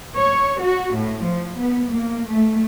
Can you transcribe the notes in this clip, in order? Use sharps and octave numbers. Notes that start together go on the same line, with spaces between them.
C#5
F#4
A2
F3
B3
A#3
A3